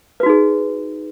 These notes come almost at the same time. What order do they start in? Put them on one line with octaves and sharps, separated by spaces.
B4 F#4 D#4 G#4